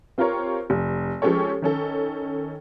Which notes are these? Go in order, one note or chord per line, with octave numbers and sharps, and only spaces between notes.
C4 F4 G4 A#4 C#5
F1
F3 G#3 C#4 G4 A4 C#5
D#3 C#4 A4